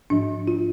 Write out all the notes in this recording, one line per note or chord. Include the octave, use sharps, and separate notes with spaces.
G#2 F3 D4
F4